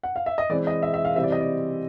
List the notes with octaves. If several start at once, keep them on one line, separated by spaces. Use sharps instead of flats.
F#5
F5
E5
D#5
E3 G#3 C4 D5
D#5
E5
E5
F5
C3 E3 G3 C4 E5
D5
D#5
D5